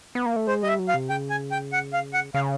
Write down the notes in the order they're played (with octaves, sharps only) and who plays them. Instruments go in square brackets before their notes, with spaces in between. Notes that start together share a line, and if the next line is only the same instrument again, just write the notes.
[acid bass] B3
A#3
A3
[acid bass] G#3 [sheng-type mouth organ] C5
[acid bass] G3 [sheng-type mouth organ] D#5
[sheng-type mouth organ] E5
[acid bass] F#3
[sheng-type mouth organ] F5
[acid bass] C3
[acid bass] C#3 [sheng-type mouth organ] G5
[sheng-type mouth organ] G#5
G5
F#5
F5
F#5
[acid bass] C#3 [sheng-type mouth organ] F5